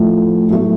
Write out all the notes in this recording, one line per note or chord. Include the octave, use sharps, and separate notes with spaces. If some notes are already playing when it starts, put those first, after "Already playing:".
Already playing: A2 F3 A3
A2 F#3 A3